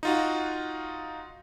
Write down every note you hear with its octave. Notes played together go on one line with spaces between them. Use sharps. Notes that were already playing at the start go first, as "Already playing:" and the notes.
D#4 F4 F#4